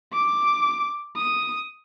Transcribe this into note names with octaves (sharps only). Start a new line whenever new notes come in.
D6
D#6